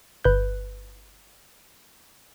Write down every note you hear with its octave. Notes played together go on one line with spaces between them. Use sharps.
G1 B4 F#6 G6